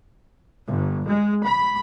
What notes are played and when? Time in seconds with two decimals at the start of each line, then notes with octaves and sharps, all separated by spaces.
0.67 G1
1.08 G#3
1.45 B5